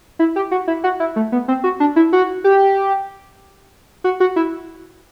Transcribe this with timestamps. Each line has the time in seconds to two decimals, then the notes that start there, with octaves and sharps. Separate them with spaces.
0.19 E4
0.36 G4
0.51 F#4
0.67 E4
0.84 F#4
1.00 E4
1.16 A3
1.32 B3
1.48 C4
1.64 F#4
1.80 D4
1.96 E4
2.13 F#4
2.44 G4
4.04 F#4
4.20 F#4
4.36 E4